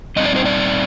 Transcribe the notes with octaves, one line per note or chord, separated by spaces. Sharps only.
A#2 G3 C4 D#4 D#5
D5
C5
D5